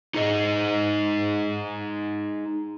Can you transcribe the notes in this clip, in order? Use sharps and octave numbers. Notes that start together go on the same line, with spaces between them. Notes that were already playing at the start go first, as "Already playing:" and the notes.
D#4 G#4 D#5